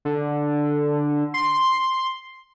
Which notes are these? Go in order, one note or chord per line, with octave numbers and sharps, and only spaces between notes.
D3
C6